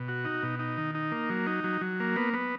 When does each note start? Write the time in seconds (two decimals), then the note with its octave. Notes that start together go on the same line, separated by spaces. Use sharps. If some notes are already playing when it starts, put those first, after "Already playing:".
Already playing: B2
0.08 F#4
0.25 D#4
0.43 B2
0.59 D#4
0.78 D#3
0.95 D#4
1.12 A#3
1.30 F#3
1.47 D#4
1.64 F#3
1.81 F#3
2.00 A#3
2.16 B3
2.34 B3